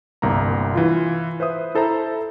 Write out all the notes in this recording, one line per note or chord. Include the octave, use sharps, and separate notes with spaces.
G1 C2 A#3 A#5
E3 F4
B4 C5 E5 D#6
E4 A4 C5 E5 A#5